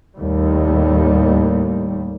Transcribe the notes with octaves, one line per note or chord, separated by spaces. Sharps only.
D#2 A2 G3